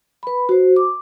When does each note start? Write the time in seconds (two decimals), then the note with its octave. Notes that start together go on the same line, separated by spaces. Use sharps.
0.23 B4 B5
0.49 F#4 C5
0.76 D6